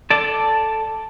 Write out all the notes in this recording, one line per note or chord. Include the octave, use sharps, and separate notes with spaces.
A4 D5